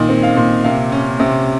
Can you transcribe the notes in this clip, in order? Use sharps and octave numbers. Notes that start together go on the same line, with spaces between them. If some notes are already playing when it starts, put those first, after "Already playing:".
Already playing: A#2 D#3 D#5
C4
F5
A#2
C3 F5
C#4
C3